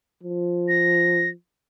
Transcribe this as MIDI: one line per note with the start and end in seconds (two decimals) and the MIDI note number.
0.23 1.32 53
0.68 1.29 94